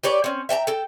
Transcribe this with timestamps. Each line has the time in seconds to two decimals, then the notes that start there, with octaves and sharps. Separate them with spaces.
0.04 G4 B4 C#5 D5
0.24 C4 C#4
0.49 E5 G5 A5 A#5
0.67 A4 G5